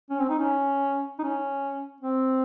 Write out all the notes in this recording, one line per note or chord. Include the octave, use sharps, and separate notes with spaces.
C#4
C4
D#4
C#4
D#4
C#4
C4